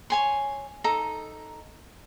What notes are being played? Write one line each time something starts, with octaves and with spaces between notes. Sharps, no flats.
C#5 G#5 C6
D#4 A4 A#5